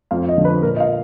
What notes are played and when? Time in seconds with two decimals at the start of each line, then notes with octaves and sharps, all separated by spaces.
0.11 F2 F5
0.29 D#5
0.37 D3 F3
0.45 B4
0.62 A#2 A#4
0.76 D#5
0.80 F5